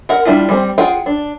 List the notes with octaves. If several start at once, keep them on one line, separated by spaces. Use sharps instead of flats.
A#4 F#5
G3 D4 E4 F4
G3 G#3 C4
F4 G#4 F#5 G5
D4